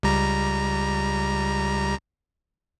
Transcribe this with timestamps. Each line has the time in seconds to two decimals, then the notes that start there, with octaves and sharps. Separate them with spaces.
0.03 C#2 G3 A#5